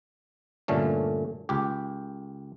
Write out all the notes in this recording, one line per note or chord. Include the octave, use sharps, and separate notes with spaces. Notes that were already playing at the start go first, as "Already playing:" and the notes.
G2 A#2 D3 A3 C#4
C#2 G4